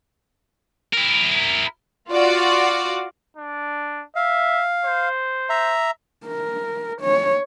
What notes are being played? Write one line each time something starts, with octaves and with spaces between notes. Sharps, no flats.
E4 A#4
F4 F#4 D5
D4
E5 F5
C5
E5 A#5
A#4
C#5